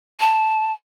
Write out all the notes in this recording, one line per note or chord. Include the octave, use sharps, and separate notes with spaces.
A5